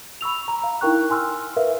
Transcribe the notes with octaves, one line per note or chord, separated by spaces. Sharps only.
B5 C#6 E6 F7
A#5
F5 A#5
D#4 E4 A#4 G5 C#6 F#6
G#5 C6 E6 F6
A#4 B4 E5 F5